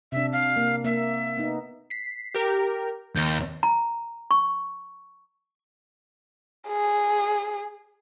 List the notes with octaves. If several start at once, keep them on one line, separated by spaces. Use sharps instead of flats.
C3 D4 E5
F5
A#3
A#3 E5
B3 D#4
B6 C7
G4 A#4
D#2 G6
A#5
C#6
G#4